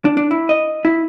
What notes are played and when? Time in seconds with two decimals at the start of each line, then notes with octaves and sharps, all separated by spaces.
0.05 D4
0.17 D4
0.31 E4
0.49 D#5
0.85 E4